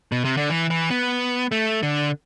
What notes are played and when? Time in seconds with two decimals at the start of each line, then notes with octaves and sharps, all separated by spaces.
0.12 B2
0.24 C3
0.37 D3
0.50 E3
0.70 E3
0.91 B3
1.52 A3
1.83 D3